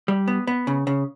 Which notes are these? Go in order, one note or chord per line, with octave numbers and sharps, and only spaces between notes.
G3
B3
B3
C#3
C#3